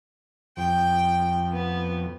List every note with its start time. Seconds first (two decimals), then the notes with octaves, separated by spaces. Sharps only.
0.57 F2 G5
1.52 B3